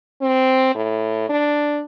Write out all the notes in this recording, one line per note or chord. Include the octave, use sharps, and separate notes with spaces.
C4
A2
D4